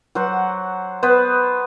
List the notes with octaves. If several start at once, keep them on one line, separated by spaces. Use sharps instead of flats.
F#3 C5 F#5
B3 B4 C5